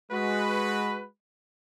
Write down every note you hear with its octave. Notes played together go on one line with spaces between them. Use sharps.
G#3 F#4 B4